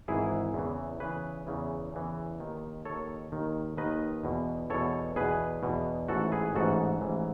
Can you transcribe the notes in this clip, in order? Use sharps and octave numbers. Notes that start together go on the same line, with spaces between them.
G#1 G#2 E3 E4 G#4
E2 C#3 E3
E2 C#3 E3 G#4 B4
E2 C#3 E3
E2 C#3 E3
D#2 D#3
D#2 D#3 A4 C#5
D#2 D#3
D#2 D#3 B4 D#5
E2 B2
E2 B2 A4 C#5
E2 B2 G#4 B4
E2 B2
A1 G#2 E3 F#4 A4
G#4 B4
A1 G#2 E3 F#4 A4
A1 G#2 E3